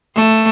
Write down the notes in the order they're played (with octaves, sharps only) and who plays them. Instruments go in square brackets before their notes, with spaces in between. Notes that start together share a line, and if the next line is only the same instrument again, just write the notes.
[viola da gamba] A3